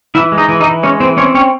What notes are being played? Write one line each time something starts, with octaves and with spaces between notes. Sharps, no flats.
E3 E4 E5
G#3
D#4 D#5
E3
D#4 D#5
E3
G#3 C#4 C#5
E3 C4 C5
C4 C#4 C#5
C4 C#4 C#5